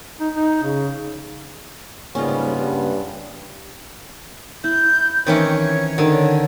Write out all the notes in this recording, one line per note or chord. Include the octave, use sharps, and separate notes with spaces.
D#4
D#4
C#3
G#2 C#3 G3 A#3 B3 C#4 F4
G2
E4 G6
D#3 E3 C4 C#4 C#5
D3 D#3 A4 C5